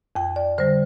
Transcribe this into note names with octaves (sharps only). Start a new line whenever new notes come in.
F2 G5
D5
D3 G3 C5